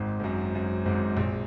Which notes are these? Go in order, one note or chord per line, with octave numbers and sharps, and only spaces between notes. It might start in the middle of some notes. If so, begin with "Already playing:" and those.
Already playing: G#1 G#2
G#2
F#2
F#2
G#1 G#2
A#1 A#2